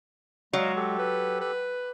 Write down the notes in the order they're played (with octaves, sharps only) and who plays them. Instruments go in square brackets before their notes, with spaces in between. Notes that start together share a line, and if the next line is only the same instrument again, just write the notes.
[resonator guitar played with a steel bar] F#3 [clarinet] G#3 [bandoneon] D#5 F5 A#5
[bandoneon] G4 A4
[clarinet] B4
B4